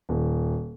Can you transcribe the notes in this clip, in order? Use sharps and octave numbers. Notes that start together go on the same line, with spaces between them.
D#1